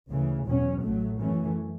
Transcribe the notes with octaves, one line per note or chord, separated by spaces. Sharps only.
D2 C#3 E3
E2 B2 F#3 C#4
A1 A2 F#3 A3
F#2 E3 A3 C#4